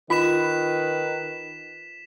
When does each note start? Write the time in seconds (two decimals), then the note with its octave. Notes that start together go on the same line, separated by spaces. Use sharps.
0.10 D#3 F4 B4 B5 B6 E7